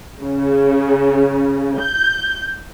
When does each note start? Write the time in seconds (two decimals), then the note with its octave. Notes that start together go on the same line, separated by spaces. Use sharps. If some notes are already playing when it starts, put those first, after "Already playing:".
0.21 C#3
1.79 G6